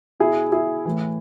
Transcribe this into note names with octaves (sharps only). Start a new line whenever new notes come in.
B2 E4 G#4
E4 G#4
A2 E3